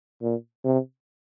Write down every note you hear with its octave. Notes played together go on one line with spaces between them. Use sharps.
A#2
C3